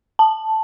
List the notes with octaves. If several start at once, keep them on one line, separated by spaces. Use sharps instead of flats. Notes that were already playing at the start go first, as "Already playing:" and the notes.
A5